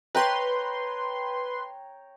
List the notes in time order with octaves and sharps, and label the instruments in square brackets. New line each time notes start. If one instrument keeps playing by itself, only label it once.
[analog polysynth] B4 C6 [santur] C#5 G5 A#5